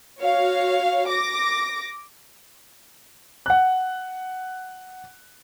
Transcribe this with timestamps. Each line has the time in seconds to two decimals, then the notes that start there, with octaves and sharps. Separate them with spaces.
0.21 F#4 C#5 F5
1.07 D6 A#6
3.46 F#5 F#6